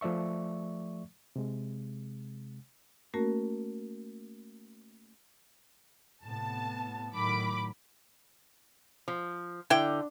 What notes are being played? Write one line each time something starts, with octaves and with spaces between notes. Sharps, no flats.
F3 A3 D5 E5 C#6
C3 G#3
A3 A#3 C#4 F#4 A#4
A2 C3 B3 A5
A2 D#3 F#3 B5 D6
F3
D3 E4 G5